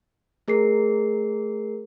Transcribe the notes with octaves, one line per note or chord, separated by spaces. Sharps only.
A3 G#4 A#4 C7